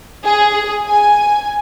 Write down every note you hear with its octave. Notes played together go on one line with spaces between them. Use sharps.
G#4
G#5